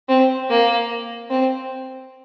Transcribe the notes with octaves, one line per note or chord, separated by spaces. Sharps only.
C4
A#3
C4